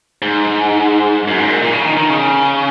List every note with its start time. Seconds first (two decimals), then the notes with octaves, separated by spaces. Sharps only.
0.22 G#2
1.28 F#2
1.38 G#2
1.50 A#2
1.63 A#2
1.73 C#3
1.86 D#3
1.97 D#3
2.09 C#3